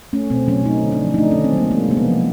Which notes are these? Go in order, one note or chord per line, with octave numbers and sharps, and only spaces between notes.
A3 C#4
B2 C4
F#3 C#4
A3 D#4
D3
D4
F3
D#4
A3 D4
D#3 C#4
C4
F#3 A#3
G#3 A#3
C3 A#3
B3
F3